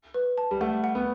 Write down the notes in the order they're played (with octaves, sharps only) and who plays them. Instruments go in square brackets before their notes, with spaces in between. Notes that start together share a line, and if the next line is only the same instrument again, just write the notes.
[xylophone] B4
A5
[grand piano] G3
[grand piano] A3 [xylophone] F#5
[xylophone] F#5
[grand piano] B3